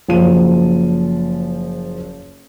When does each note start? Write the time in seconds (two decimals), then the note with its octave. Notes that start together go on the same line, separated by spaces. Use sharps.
0.08 F#1 F3 D#7